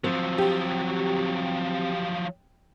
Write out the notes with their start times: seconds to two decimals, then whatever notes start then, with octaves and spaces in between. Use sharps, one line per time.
0.04 F3 F#3 C4
0.38 G4